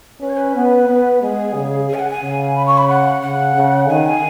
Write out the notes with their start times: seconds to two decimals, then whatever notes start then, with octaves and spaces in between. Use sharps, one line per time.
0.21 C#4 B4
0.29 C#5
0.37 B4
0.55 B3
0.88 B3
1.21 G#3 G#4
1.55 C#3
1.88 G#4
1.94 G#5
1.99 F#5
2.11 G#5
2.22 C#3
2.55 B5
2.67 C#6
2.78 B5
2.89 F#5
3.22 C#3 F#5
3.56 C#3
3.89 D#3 G#5